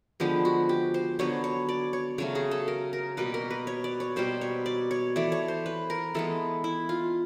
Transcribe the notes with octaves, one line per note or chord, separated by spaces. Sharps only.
D3 F3 G#3 B3 G4
F#4
G4
C5
D3 F#3 B3 C#5
C#5
D5
C#5
C#3 F#3 A3 C#5
G#4
A4
A#4
A#4
B2 G3 A#3 B4
A#4
B4
C#5
D5
C#5
B2 G3 A#3 C5
C#5
D5
C#5
E3 A3 D5
C#5
C5
B4
A#4
E3 G#3 B3 A4
E4
F4